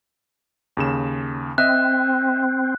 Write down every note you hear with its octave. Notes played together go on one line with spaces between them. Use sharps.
D#2 C#3 E7
C4 D#5 E5 F#6